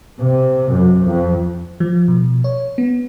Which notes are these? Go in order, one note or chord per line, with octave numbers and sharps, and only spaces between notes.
C3
F#2
F2
F3
B2
C#5
B3